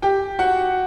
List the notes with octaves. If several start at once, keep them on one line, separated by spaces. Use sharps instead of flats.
G4 G5
F#4 F#5